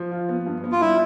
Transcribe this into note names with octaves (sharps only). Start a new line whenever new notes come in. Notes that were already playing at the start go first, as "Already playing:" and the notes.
Already playing: F3
F4
B3
G2
B3
F4
G3 E4